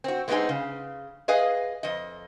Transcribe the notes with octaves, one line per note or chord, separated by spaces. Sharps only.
C4 F#4
G#3 A3 B3 C4 D#4 G#4
C#3
G#4 B4 D#5 F5 G#5
F2 D#5